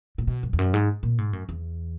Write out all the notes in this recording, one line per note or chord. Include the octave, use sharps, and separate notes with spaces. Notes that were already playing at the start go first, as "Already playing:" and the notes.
A#2
B2
F#2
E2
F#2
G#2
A#2
G#2
F#2
E2